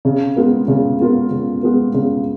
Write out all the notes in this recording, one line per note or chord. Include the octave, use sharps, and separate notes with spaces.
C#3
G#3 B3 F4 A#4
C#3
G#3 B3 F4 A#4
C#3
G#3 B3 F4 A#4
C#3